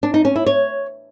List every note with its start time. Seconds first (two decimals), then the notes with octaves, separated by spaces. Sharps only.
0.03 D4
0.14 D#4
0.25 C#4
0.36 E4
0.46 C#5